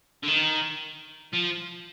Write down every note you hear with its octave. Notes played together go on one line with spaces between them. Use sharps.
D3
D#3
F3